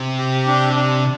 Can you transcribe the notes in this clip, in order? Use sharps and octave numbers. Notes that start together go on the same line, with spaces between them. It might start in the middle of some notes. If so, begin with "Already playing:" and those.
Already playing: C3
G4
D4
D4